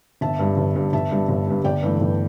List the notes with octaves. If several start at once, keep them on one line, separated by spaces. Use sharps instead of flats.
G1 E5 A5
G2 G3
G1
G2 G3
G1 E5 A5
G2 G3
G1
G2 G3
G1 D5 G5
G2 E3 A3
G1